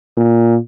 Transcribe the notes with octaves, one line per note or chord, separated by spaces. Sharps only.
A#2